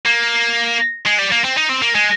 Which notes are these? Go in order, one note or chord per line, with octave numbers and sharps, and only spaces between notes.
A#3
G#3
G3
A#3
C4
D#4
C4
A#3
G#3